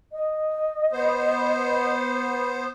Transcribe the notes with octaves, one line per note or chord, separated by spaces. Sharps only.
D#5
B3 C5